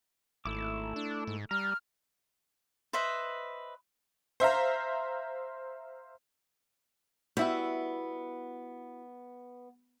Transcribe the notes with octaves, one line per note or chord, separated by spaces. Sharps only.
G#1 A3 E4 D6
D4
G#2
G3 A#5 F6
B4 C5 D#5 E5
C5 E5 F5 A#5
G3 B3 E4 F#4 E5 F#5